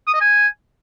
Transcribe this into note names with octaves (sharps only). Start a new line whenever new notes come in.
D#6
D#5
G#5